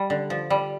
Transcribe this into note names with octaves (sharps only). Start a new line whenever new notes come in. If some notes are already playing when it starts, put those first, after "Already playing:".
Already playing: G3
D3
F3
G3